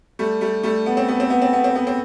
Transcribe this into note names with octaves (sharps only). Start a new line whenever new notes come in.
G3 A3
G3 A3
G3 A3
B3
C4
B3
C4
B3
C4
B3
C4
B3
C4